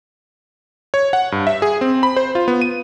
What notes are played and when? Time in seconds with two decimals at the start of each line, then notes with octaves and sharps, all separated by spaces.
0.94 C#5
1.13 F#5
1.32 G2
1.47 E5
1.62 G#4
1.81 C4
2.03 B5
2.16 C5
2.35 F4
2.48 B3
2.62 D#7